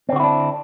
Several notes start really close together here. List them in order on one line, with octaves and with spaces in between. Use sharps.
C4 D3 F#4 E4 D4